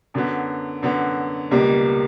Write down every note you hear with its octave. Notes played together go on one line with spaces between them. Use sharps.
F#2 D3 F#3 B3
F#2 D3 F#3 B3
C#2 B2 G3 A#3